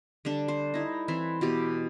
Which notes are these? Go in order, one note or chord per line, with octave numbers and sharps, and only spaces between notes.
D3 G3 D4 A4
C5
D#4 E4
E3 C4 E5 C6
B2 E3 G4